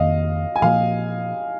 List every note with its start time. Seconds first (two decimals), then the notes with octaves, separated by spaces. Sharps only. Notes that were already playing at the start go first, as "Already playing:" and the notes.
Already playing: F2 D#3 A#3 D#5 F5
0.56 G#5
0.62 A#2 F3 A#3 F5